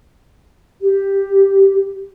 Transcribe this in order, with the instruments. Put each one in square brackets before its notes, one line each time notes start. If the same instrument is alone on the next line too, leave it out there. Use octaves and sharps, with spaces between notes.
[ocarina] G4